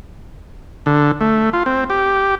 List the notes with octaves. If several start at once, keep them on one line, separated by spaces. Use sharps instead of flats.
D3
A3
F4
C4
G4